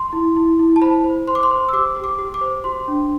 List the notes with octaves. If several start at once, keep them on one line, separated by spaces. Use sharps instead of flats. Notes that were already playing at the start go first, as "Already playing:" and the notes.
Already playing: C6
E4
E4
E4
A5
C5 B5
C5
C5 C6
D6
C6
C5
E6
G4 D6
G4
D6
G4
D6
C5
F#4 C6
D4